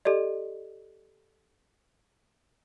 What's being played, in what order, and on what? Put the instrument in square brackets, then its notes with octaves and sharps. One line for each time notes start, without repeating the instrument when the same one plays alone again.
[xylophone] G4 A4 D5 D#5